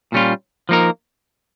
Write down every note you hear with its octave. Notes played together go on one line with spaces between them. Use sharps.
A#2 G3 C#4 F4
F3 A#3 D#4 A#4